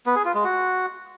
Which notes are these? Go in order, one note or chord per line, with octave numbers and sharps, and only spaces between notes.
B3
G#4
F4
G#3
F#4